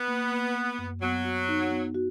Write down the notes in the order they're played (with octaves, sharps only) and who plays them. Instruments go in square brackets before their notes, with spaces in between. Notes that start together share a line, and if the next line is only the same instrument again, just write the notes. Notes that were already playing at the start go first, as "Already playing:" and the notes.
Already playing: [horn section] B3
[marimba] A#3
A#3
A#3
F#2
[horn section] F#3 [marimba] B3
[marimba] F#4
D#4
B3
F#4